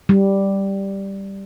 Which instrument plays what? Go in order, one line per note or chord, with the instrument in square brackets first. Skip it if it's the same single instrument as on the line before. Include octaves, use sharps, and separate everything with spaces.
[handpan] G3